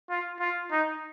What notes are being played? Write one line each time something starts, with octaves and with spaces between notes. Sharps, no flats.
F4
F4
D#4